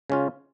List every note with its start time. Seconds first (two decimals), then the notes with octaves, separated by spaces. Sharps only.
0.10 C#3 G#3 C#4 F4